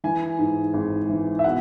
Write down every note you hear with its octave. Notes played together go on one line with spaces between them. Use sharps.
E3 G#5
G#2
G#1
E3
E5
B2 F#5